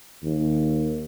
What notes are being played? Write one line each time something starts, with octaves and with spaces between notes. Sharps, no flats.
D#2